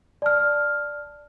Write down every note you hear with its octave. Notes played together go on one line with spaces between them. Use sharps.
D5 A5 F6